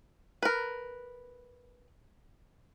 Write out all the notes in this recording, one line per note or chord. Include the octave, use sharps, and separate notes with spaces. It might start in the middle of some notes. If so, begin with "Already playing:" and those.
A#4 B4